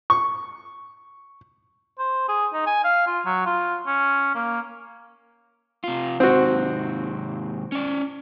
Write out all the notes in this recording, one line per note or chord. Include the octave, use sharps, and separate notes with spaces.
C#6
C5
G#4
D#4
G#5
F5
F4
F#3
F4
C#4
A#3
C3 F4
G#2 C3 D#3 C4 F#4
C#4 D5